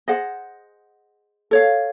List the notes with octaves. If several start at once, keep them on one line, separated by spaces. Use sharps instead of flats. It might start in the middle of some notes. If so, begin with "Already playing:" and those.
G#4 C5 D#5 F#5
A4 C#5 F5